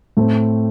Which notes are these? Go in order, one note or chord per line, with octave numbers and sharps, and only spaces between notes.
A2 A3 C4